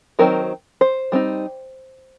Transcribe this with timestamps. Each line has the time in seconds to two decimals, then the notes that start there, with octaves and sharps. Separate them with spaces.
0.19 D#3 F#3 C4 D#4 A#4
0.81 C5
1.12 G3 C4 D#4